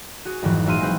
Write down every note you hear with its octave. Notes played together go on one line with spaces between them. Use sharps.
F#4 G#4
G#1 F2 G#2 D#3 E3 F#3
A#1 F#4 E5 F5 C6 D#7
G#3 C4 B4 C5